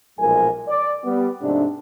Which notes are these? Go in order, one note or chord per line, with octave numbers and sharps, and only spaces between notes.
B1 A#2 F3 G#3 A#4 G#5
D5
G3 B3
G#2 C3 F3 A3 D4